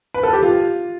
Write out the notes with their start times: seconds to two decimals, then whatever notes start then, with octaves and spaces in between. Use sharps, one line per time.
0.14 B4
0.23 A4
0.33 G4
0.43 F4